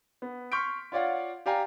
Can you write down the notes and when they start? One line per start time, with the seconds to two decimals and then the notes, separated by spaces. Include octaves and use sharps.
0.22 B3
0.52 C6 C#6 F6 G6 B6 D7
0.92 F4 C#5 D5 F5 F#5
1.46 G4 D5 F5 G5 G#5 A#5